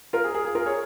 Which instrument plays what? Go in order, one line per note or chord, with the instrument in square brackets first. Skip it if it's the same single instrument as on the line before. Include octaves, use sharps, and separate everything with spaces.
[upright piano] F4 A#4
G#4
G#4
G#4
F4 A#4
G#4 C#5